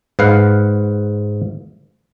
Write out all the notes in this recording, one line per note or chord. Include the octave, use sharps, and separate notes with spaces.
G#2 B4 F5 F#5